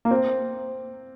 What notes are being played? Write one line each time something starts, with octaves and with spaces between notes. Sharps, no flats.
A#3
C4